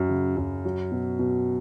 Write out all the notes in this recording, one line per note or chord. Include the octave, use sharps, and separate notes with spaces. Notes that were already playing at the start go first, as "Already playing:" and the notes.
Already playing: F#2 F#3
C#3
F#2
F#3
B2
B2